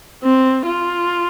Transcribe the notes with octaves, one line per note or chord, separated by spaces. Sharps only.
C4
F4